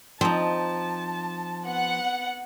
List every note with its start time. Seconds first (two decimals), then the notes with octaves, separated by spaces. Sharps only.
0.21 F3 C4 D#4 A5
1.66 B3 F#5